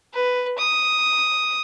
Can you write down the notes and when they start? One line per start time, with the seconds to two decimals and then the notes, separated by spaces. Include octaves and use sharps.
0.14 B4
0.58 D#6